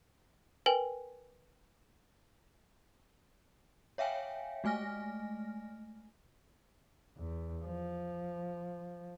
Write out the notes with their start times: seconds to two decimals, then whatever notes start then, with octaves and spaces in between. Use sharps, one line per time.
0.66 A#4 B4 G5 G#5
3.98 C#5 E5 F5 G5 G#5
4.64 G#3 A3 G#5 F6 A#6
7.17 E2
7.65 F3